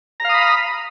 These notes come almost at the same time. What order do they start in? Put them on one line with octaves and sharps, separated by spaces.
A#5 F5 D#6 B5